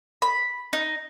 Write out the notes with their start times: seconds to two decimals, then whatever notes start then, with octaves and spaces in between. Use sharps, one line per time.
0.22 B5
0.73 D#4